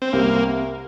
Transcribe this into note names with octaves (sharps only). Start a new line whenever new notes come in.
C4
C2 A#3